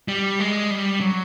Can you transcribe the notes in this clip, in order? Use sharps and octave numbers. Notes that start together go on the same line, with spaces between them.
G3
G#3
G3
F#3